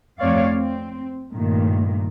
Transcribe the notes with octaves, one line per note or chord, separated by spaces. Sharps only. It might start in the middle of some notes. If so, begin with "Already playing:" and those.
F2 A3 C4 C#5 D5 F5
C4
G2 A#2 D#3 A3